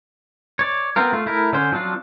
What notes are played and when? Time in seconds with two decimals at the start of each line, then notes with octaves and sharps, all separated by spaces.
0.59 C#5 D5
0.96 B3 C4 F4 A#4
1.13 A3 F4
1.26 A3 E4 A#4
1.53 D3 C#4 C5
1.72 F3 F#3 C4 D4 F4